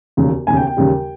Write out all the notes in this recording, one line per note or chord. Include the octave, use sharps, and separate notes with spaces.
E1 D#2 C#3
E1 D#2 C#3 G#5
G5
G5
D#2 C#3 G3